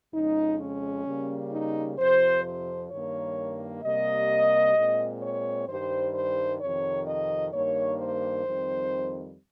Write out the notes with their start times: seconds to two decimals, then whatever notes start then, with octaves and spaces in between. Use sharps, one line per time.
0.13 F2 C#3 G#3 D#4
0.60 C#4
1.06 C#3 G3 A#3
1.52 D#4
1.99 F2 C3 F3 C5
2.45 C5
2.91 G2 D#3 A#3 C#5
3.84 C3 G3 A#3 D#5
4.76 A#2 G#3 C4
5.22 C#5
5.68 G2 D#3 G3 C5
6.15 C5
6.61 F2 C3 D#3 C#5
7.08 D#5
7.53 G2 D#3 A#3 C#5
8.00 C5
8.46 F2 D#3 G3 C4